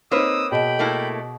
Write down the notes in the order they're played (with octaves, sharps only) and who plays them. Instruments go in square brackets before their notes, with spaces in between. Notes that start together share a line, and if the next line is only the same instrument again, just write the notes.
[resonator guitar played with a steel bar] A#3 B4 [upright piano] C4 D#4 [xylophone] C#5 [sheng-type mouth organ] D#6 E6
[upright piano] B2 [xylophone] G#4 D#5 D7 [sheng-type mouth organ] G5 B5
[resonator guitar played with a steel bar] A3 A#3 E4